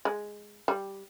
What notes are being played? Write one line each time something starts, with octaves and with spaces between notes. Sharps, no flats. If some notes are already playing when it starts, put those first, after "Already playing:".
G#3
G3